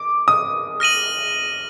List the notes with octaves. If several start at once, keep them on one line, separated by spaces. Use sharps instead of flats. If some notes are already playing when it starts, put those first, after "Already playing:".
Already playing: D6
D#6
F6 A#6 D#7 F#7